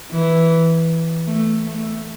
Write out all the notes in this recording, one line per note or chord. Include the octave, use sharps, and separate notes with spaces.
E3
A3
A3